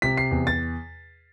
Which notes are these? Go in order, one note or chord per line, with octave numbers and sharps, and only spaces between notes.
C3 B6
C7
E2
A6